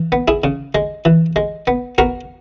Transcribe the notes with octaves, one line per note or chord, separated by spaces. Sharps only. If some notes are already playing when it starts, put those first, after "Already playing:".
Already playing: E3
B3
E4 G#4
C#3
G#3
E3
G#3
B3
B3 F#4 A#4